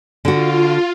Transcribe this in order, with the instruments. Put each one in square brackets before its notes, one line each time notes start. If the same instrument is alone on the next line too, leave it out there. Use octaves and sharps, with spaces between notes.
[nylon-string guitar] D3 F#4 [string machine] F4